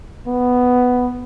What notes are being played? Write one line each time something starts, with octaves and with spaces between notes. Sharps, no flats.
B3